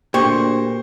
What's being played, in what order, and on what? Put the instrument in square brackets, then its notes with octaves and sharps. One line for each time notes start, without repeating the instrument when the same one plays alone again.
[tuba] D2 [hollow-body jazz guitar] A#2 [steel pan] G4 C#6 [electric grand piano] C5